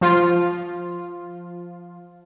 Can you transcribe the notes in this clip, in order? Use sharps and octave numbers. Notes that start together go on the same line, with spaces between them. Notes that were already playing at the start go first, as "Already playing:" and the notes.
F3 F4